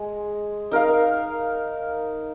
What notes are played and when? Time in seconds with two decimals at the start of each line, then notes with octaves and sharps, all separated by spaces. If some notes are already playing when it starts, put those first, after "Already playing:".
Already playing: G#3
0.71 D#4 A#4 F5